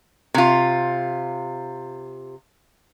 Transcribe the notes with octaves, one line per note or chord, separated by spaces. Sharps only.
C3 F4